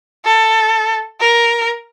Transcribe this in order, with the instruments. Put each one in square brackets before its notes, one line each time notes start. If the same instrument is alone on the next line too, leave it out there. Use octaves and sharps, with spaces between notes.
[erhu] A4
A#4